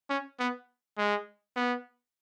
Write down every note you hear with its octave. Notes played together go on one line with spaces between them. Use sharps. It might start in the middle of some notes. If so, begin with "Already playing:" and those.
C#4
B3
G#3
B3